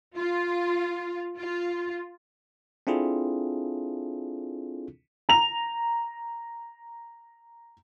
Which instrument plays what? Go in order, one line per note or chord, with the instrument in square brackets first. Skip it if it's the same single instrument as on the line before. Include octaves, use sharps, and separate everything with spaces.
[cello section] F4
F4
[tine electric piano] C4 D4 E4 F4 G#4 A4
[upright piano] A#5 F7